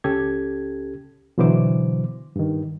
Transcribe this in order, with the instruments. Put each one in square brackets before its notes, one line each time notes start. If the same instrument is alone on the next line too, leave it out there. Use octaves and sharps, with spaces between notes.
[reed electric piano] C#2 C#4 G4 A4 G#6
B2 D3 E3 F#3 C5 D6
G2 D#3